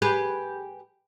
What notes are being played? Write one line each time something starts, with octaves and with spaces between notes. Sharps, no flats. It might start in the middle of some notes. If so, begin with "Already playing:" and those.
G4 G#4 B4